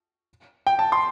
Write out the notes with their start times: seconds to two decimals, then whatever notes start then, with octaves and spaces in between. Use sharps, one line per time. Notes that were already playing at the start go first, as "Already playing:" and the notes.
0.67 G5
0.79 A5
0.92 C6